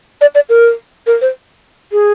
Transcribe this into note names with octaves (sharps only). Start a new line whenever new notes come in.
D5
D5
A#4
A#4
C5
G#4